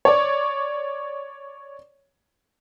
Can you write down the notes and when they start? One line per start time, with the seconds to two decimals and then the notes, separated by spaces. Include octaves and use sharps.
0.05 C#5 D5